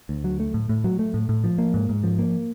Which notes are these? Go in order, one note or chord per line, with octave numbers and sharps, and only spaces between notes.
D2
F#3
A3
A2
A2
F#3
A3
A2
A2
F3
A#3
G#2
G#2
F3
A#3